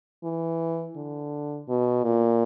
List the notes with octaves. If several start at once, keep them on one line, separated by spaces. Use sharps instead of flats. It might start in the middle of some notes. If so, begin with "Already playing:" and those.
E3
D3
B2
A#2